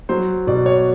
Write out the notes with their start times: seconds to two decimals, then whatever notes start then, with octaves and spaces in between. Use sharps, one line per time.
0.09 F#3 C5
0.47 B2 D5
0.66 C#5